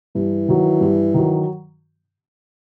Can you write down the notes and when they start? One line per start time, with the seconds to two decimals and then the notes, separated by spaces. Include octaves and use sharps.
0.15 G2 E3
0.49 D#3 F#3
0.81 G2
1.14 D#3 F#3